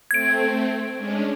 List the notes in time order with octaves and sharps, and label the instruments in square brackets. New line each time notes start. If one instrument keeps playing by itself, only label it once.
[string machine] A3 C4 [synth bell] G#6 D7
[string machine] G#3 C#4 D4